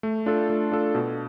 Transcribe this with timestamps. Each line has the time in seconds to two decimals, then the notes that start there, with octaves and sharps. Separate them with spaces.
0.03 A3
0.26 D4 F4 A4
0.50 A3
0.72 D4 F4 A4
0.95 B2